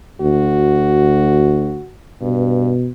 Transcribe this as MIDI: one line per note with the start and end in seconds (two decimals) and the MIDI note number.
0.21 1.80 38
0.21 1.91 66
2.22 2.71 43
2.22 2.90 47